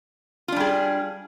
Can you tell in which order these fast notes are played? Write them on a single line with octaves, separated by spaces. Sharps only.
F4 D4 G3 G#4